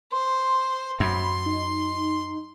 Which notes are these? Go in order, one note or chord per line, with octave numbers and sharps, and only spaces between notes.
C5 C6
F#2 B5 C6
D#4